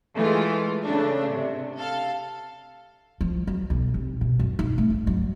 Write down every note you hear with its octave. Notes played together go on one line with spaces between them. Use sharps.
E3 G#3 A3 F4
C#3 A3 D4
C3
A4 F5
F3
F#3
B1
C3
B2
F#2
D#4
A3
G#2
F#3